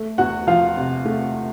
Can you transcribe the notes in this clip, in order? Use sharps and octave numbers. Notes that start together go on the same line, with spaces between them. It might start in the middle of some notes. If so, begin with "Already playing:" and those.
Already playing: A3
E2 F#4 F#5
F3 F4 F5
C3
A3